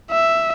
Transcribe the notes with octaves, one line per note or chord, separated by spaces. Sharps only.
E5